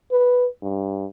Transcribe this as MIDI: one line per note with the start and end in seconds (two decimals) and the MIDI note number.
0.11 0.47 71
0.62 1.06 43